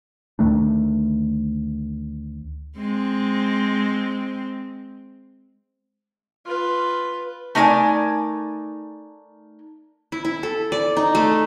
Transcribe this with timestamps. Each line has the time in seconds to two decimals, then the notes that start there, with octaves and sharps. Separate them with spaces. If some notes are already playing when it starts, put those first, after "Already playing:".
0.39 D2 D#3 A3 D4
2.78 G#3 C4
6.46 F4 B4
7.55 A3 D#4 A#4 C5 D5 G#5
10.12 E4
10.25 E4
10.43 A4
10.72 D5
10.97 D#4
11.15 A3